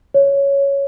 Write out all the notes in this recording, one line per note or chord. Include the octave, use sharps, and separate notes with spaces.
C#5